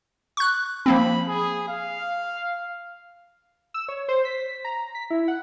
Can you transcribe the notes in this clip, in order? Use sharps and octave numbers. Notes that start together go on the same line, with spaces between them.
C#6 F#6
F3 A#3 C4 B5
G#4
F5
E6
C#5
C5
B6
A#5
B6
E4
F#5